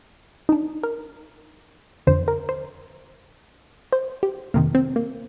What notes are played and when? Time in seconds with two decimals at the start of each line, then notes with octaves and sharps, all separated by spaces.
0.49 D#4
0.52 D4
0.83 A#4
2.07 F2 D3 C5
2.28 A#4
2.49 C5
3.93 C5
4.23 G4
4.54 F2 C3 D#3 A#3
4.75 C4
4.96 A#3